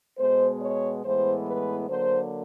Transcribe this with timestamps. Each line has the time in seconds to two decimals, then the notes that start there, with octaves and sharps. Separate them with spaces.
0.18 B2 G#3 B3 C5
0.61 C#5
1.03 A2 E3 G#3 B3 C5
1.46 B4
1.88 D3 F#3 A#3 C5